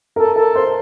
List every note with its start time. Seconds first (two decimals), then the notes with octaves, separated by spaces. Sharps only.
0.15 A4 A#4
0.35 A4 A#4
0.54 C5 C6